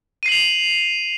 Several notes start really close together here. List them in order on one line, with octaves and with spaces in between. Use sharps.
D#7 C7 F#7 F7